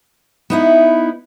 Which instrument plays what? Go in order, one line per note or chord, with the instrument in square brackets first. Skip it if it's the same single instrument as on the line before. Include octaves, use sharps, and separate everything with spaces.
[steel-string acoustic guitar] B3 D#4 E4